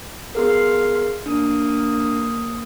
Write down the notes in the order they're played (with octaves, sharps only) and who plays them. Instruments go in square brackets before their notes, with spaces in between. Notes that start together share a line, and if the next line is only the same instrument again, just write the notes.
[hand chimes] B3 G#4 A#4 [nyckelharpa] F5 C6
[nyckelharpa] A#3 D#6 [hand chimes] D4